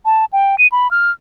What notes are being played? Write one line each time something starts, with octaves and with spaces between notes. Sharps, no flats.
A5
G5
D#7
B5
F6